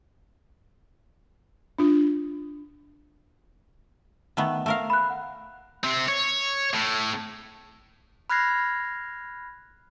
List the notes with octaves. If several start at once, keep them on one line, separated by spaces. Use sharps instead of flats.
D4 F4
D#3 A3 B3
A3 A#4 F5
B5 F#6
F#5
C3 C4
C#5
A2
B5 F6 F#6 G#6 A#6 C7